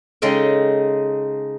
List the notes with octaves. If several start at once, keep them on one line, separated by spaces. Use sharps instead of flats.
C#3 G#3 D#4 A4 G5